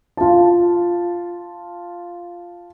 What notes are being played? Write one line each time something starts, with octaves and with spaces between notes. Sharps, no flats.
F4 A5